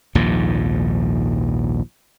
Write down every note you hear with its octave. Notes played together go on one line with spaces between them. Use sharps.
A#1 D#2 G#2 F3